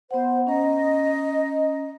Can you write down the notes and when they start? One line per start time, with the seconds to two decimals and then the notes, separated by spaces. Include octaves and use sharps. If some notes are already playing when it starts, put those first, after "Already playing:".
0.11 B3 C5 F#5
0.47 C#4 D#5 A#5